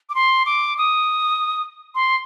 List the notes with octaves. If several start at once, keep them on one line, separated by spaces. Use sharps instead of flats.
D6
C6
D6
D#6
C6